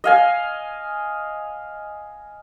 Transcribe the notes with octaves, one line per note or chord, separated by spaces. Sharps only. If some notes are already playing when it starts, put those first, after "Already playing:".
D#5 F5 G#5